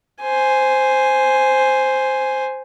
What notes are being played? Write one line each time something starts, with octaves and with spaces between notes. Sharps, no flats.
C5 G#5